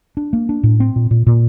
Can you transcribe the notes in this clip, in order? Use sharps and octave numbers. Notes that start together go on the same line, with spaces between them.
D4
A#3
D4
A2
C4
A#2
A#2
A#2